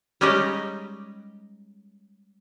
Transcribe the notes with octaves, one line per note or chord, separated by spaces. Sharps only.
G3 G#3 C#4 D#4 G4 D#5